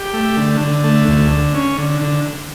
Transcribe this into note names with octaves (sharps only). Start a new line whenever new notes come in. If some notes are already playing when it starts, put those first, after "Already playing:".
Already playing: G4
A3
D3
D3
A3
D2
D3
C#4
D3
D3